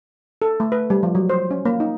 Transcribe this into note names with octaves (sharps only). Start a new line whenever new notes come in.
A4
A3
B4
G3
F3
F#3
C5
C#4
A#3
D#4